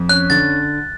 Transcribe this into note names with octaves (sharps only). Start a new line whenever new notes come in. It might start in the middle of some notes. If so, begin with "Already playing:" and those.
Already playing: F2
C#4 F#6
D3 A6